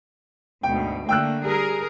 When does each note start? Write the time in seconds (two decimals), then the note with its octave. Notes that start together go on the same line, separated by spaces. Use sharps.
0.63 D2 G#2 B2 G5
1.09 D3 A3 A#3 G5 E6 F#6
1.44 G3 G#4 A#4